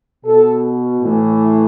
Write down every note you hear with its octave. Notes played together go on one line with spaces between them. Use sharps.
B2 A4
A2 E3